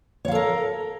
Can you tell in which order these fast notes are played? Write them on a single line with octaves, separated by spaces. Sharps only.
C#5 F5 A4 A#4